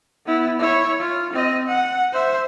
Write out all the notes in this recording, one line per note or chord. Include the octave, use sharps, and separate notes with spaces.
B3 E4
E4 C#5
F4
C4 D#5
F#5
C5 E5